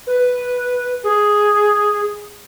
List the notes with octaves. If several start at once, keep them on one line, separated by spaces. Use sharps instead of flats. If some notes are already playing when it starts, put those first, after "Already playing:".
B4
G#4